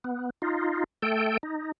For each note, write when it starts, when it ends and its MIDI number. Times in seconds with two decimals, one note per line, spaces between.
0.04 0.30 59
0.42 0.84 63
0.42 0.84 65
1.02 1.37 57
1.02 1.37 69
1.02 1.37 79
1.43 1.72 63